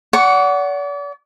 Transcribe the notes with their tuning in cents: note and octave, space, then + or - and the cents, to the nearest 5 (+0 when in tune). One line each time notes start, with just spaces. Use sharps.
D5 -40 F#5 +5 C#6 +0